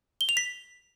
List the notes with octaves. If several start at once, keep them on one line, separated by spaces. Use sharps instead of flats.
G7
F7
B6